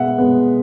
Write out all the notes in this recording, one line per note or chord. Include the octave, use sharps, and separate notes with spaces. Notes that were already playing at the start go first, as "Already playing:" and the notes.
Already playing: B2 G#3 B3 E5 F#5
B2 G#3 B3